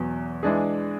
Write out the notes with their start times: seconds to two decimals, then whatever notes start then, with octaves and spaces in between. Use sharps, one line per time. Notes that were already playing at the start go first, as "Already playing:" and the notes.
Already playing: E2 B2 F#3
0.43 E3 G#3 D4 G#4